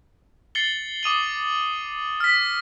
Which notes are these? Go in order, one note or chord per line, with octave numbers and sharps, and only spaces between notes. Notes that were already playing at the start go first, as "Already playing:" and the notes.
A6 C7 C#7 F#7 G7
D6 D#6 D#7 F#7
F6 B6